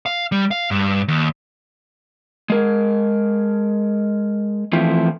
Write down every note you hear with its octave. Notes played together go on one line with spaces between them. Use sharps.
F5
G3
F5
G2
D#2
G#3 A#4
E3 F3 A3 C4 E4 F4